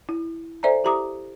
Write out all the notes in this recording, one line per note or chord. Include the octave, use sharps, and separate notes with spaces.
E4
A4 C5 D5 E5 G#5 A#5
E4 G4 E5 A#5 D6 D#6